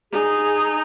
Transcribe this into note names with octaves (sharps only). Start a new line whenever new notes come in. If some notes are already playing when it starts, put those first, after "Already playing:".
D#4 G#4